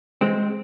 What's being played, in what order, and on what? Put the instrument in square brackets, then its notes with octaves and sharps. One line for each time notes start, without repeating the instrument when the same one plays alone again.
[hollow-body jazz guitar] E3 G#3 C4